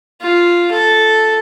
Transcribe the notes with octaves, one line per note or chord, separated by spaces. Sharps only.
F4
A4